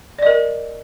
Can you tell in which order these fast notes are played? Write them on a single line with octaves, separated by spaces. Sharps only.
D5 D#5 A#4